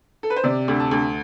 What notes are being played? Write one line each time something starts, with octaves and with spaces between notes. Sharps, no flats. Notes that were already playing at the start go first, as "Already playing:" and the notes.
A4
B4
C5
C3 D5
D2
A5
D2